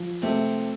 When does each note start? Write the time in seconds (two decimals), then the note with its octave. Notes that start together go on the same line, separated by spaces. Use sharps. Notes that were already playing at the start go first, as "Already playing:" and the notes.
Already playing: F3
0.22 C3 A3